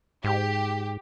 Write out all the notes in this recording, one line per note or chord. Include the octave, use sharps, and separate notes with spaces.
G#2 G4